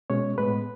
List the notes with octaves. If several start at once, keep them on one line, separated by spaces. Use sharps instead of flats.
B2 G#3 C#4 C#5
A2 G#3 B3 B4